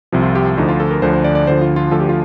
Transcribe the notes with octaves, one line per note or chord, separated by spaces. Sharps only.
C2 C3 F3
F4
G4
D2 D3 F3 D#4
F4
A4
A#4
D2 D3 F3 C5
C5
D5
D5
D2 D3 F3 C5
F4
F4
D2 D3 F3 A4
G4
F4